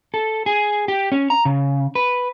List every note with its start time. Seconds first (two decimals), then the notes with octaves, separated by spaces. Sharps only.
0.14 A4
0.46 G#4
0.88 G4
1.12 C#4
1.30 A#5
1.45 C#3
1.95 B4